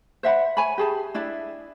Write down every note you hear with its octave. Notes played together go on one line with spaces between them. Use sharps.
C5 E5 F#5 B5
C#5 G#5 B5
G4 G#4 A5
D4 E4 D5 E5